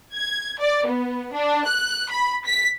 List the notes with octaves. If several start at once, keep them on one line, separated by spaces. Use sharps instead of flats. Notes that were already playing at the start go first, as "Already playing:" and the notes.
G#6
D5
B3
D4
F#6
B5
B6